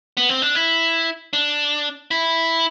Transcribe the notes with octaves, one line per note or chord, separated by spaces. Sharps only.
B3
C4
D4
E4
D4
E4